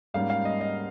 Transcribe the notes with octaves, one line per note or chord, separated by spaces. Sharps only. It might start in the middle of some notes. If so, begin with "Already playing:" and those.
G#2 G3 A#3 C#4 F5
F5
D#5
D#5